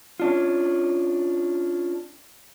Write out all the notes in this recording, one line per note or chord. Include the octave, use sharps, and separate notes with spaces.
C#4 D4 F4